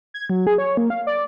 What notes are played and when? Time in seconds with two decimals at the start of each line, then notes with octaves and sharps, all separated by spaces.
0.14 G#6
0.30 F#3
0.47 G#4
0.58 C#5
0.77 A#3
0.90 F5
1.07 D5